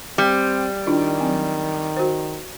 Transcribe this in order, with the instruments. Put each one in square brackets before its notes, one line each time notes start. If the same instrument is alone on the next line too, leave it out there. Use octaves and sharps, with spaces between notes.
[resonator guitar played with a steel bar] G3 [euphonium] C4
[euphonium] D#3 [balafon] D4 E4 F4
[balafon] F#3 C4
F#4 C5